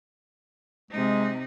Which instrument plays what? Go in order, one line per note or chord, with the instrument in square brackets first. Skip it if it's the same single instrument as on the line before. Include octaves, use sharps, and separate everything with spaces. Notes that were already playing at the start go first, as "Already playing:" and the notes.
[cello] C3 D#4 [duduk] G#3